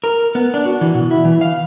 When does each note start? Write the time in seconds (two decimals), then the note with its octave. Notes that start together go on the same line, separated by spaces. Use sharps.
0.04 A#4
0.35 B3
0.54 D4
0.66 F#4
0.81 E3
0.95 B2
1.11 E4
1.25 E3
1.41 F5